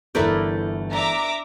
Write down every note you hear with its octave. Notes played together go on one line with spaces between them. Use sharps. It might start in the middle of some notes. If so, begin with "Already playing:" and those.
G1 E3 A3 E4 A#4 B4 D5 G6
D4 E5 A#5 D6